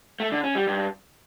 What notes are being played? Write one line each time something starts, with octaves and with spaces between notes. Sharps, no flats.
A3
D3
C#4
G3
G2